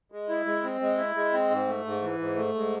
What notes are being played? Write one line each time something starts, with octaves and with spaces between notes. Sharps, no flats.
G#3
E4
G#3
C4
G#3
E4
G#3
C4
G#2
A3
G#2
E3
G#2
A3
G#2